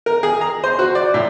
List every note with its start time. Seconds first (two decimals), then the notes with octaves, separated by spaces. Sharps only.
0.06 A#4
0.23 G#4
0.41 A#5
0.64 C5
0.79 F#4
0.95 D5
1.14 A2